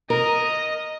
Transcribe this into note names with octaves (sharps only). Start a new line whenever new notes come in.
A#4 D#5